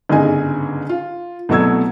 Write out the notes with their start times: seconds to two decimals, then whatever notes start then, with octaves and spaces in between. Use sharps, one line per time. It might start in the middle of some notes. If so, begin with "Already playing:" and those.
0.09 G1 G#2 C#3 G#4 D#5 G#5
0.89 F4
1.49 C2 B2 F#3 A3 E6 G#6